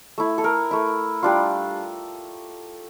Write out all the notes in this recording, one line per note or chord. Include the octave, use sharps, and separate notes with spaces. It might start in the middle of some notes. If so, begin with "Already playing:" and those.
A3 E4
A4
A#4
A3 E4
G3 D4 F4